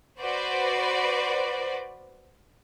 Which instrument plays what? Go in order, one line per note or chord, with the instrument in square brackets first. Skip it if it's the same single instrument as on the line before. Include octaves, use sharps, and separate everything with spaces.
[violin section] F#4 B4 C5 D5